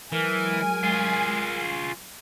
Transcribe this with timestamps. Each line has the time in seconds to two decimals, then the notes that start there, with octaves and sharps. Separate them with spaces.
0.12 E3 F#3 G#3 A#4 G#5
0.83 F4 G#4